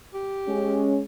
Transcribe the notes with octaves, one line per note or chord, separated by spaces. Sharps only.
G4
G#3 C#4